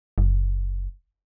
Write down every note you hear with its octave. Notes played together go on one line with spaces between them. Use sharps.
F#1